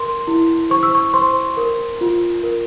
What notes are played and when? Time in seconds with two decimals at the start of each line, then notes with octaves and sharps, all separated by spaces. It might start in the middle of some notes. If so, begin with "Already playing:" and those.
Already playing: A#4 C6
0.27 E4
0.70 C5 C#6
0.83 E6
0.95 C#6
1.14 C5 C6
1.57 A#4
2.01 F4
2.43 A#4